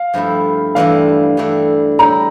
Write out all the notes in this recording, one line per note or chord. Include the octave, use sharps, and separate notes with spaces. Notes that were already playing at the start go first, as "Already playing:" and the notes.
Already playing: F5
G2 F3 A3 E4
G2 E3 A3 D4 F5
G2 E3 A3 D4
C#3 G3 C#4 E4 A#5